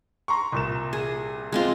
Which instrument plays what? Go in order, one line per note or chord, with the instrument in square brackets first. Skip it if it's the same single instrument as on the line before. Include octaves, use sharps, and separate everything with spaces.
[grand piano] A#5 C6 C#6
C2 A#2 E7
[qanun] G#4
G#3 C4 F4